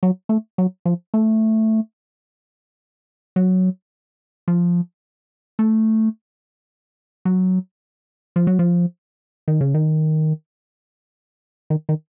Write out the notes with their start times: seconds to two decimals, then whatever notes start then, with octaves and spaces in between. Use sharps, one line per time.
0.03 F#3
0.29 A3
0.58 F#3
0.85 F3
1.14 A3
3.36 F#3
4.48 F3
5.59 A3
7.25 F#3
8.36 F3
8.47 F#3
8.59 F3
9.48 D#3
9.61 C#3
9.74 D#3
11.70 D#3
11.89 D#3